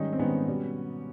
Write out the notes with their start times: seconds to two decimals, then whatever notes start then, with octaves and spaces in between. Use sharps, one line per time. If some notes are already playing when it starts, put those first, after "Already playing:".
Already playing: G#2 D#3 G3 C#4 D#4
0.13 C4
0.19 G#2 D#3 G3 B3 C#4
0.47 B2 G3